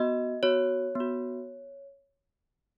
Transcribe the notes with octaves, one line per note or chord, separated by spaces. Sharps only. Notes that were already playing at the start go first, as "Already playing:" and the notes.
Already playing: B3 F#4 D#5
B3 F#4 C#5
B3 F#4